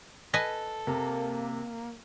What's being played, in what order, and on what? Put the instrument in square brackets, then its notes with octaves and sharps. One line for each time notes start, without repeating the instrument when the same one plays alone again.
[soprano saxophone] A4 [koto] B4 D#5 G#5
[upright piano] C3 [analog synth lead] A#3